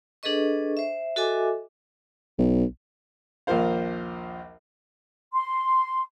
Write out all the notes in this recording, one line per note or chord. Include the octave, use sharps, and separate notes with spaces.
D4 G#4 A4 B4 D#5 C#6
C5 E5
F#4 A4 D#5 E5 G#5 D6
B1
A#1 D#2 F3 A#4 C5 F5
C6